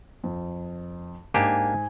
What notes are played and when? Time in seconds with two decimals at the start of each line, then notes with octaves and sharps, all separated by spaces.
0.24 F2
1.34 G#2 A#3 D4 G4 G#5